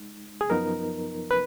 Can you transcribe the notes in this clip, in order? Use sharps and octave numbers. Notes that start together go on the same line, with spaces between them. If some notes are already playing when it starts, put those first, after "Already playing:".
Already playing: G#3 D#4
G#4
F#2 F3 B3 D#4 A#4
B4